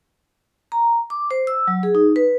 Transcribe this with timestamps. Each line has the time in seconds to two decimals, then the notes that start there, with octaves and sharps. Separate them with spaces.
0.72 A#5
1.10 D6
1.31 C5
1.47 E6
1.68 F#3
1.83 G#4
1.95 D#4
2.16 B4